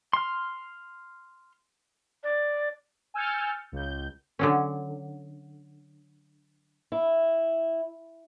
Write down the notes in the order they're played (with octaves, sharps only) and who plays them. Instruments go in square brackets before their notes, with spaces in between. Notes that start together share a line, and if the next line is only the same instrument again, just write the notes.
[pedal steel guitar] C6 F6
[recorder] D5
[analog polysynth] G#5 E6 F6 G6 A6 C#7
C#2 G6
[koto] D3 F#3 C#4
[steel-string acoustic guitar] E4